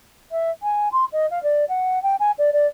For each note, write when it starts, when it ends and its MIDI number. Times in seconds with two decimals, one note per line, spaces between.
0.31 0.50 76
0.62 0.88 80
0.92 1.04 84
1.12 1.26 75
1.30 1.42 77
1.43 1.65 74
1.68 2.02 78
2.02 2.16 79
2.19 2.31 80
2.38 2.50 74
2.53 2.66 74